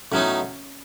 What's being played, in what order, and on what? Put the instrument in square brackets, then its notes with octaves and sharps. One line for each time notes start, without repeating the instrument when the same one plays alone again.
[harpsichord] A2 F#3 B3 D#4 [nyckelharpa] C#4